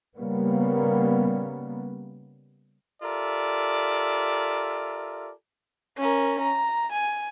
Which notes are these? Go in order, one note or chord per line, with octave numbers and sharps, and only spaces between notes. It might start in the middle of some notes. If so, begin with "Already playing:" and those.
C#3 G3 A#3 B3
F4 G4 A4 A#4 D5 E5
C#4 A#4
A#5
G#5